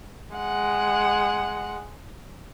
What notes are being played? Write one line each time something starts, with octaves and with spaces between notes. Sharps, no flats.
G#3 F#5